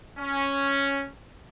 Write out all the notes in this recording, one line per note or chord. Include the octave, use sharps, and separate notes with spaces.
C#4